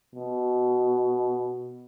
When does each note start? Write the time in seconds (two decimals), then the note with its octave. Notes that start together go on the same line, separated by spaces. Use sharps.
0.15 B2